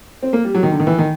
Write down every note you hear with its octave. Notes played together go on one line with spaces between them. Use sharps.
C4
A#3
G3
F#3
D#3
D3
D#3
E3
D#3